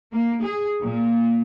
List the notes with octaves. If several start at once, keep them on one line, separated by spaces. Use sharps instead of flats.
A#3
G#4
A#2